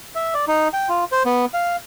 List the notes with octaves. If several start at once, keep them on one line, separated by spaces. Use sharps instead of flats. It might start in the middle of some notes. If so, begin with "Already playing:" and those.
E5
D5
D#4
G5
F4
C5
B3
F5